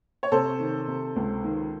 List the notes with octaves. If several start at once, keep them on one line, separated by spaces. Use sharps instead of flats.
C#5
C3 A4 C5
D#3
C3
C#2
D#3